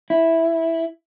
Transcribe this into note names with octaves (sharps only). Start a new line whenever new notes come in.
E4